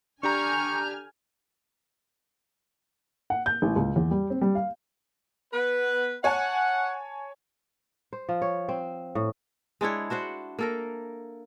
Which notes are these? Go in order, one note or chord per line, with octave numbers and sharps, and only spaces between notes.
D3 D4 G4 G#5 A#5 C#6 F6 G6
F#5
G6
A1
C#2
E2
G3
C4
G3
F5
B3 B4
C#5 F#5 G#5 A5
C5
F3
C#5
C4
A2
G#3 D4 E4 C#5
D4 F#4 C5 F#5
A#3 A4 A#4